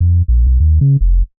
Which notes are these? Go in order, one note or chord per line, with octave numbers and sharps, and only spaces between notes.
F2
A#1
B1
D#2
C#3
F1